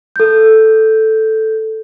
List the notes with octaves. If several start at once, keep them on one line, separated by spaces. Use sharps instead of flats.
A4 G6